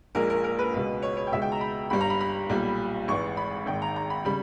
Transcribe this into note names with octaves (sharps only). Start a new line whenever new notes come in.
A#1 A#2 G#3 A#4
A#4
A#4
B4
C#2 B2 G#3
C#5
C#5
G5
C#2 B2 G#3 E5
G5
A#5
B5
G1 G2 G3 B5
A#5
B5
B5
B1 A#2 G3
G#1 G#2 E3 C#6
B5
G#1 G#2 D#3 G5
A#5
A#5
B5
C#3 G3 B5